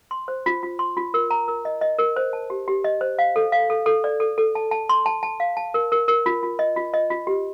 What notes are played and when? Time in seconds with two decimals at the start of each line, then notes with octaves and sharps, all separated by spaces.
0.11 C6
0.28 C5
0.46 F4
0.63 F4
0.79 C6
0.97 F4
1.14 A#4
1.31 A#5
1.48 A#4
1.65 D#5
1.81 D#5
1.98 A#4
2.16 C5
2.33 A5
2.50 G4
2.68 G4
2.84 D#5
3.01 C5
3.19 F5
3.36 A4
3.52 F5
3.70 A4
3.86 A4
4.04 D5
4.20 A4
4.38 A4
4.55 A5
4.71 A5
4.89 C6
5.06 A5
5.23 A5
5.40 F5
5.57 A5
5.74 A#4
5.92 A#4
6.08 A#4
6.26 F4
6.43 F4
6.59 D#5
6.76 F4
6.94 D#5
7.10 F4
7.27 G4